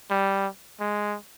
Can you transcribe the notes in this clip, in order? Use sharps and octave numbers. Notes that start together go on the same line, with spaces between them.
G3
G#3